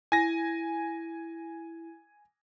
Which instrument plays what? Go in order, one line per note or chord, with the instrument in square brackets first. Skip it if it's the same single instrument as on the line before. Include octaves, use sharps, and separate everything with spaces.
[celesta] E4 [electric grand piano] G#5 A#6